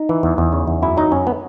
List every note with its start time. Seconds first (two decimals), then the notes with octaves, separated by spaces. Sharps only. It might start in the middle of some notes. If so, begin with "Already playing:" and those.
Already playing: D#4
0.09 E3
0.23 E2
0.38 E2
0.53 C#3
0.68 E2
0.82 F#2 E4
0.97 F#3 D#4
1.12 F#2 C#4
1.27 B3